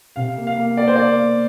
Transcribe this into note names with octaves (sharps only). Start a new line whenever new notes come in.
C3 F5
A#3
F5
A#3
A#3 D5
C5
A#3 D5
A#3